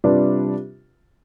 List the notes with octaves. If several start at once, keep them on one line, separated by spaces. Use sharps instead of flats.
C3 G3 D4 F4 B4